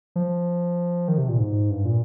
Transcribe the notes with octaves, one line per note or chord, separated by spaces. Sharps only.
F3
D#3
C3
A#2
G#2
G2
A#2